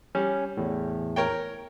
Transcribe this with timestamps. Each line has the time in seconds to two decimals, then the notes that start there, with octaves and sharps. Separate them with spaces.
0.15 G3 C#4
0.57 E2 A2
1.16 A#4 C#5 G5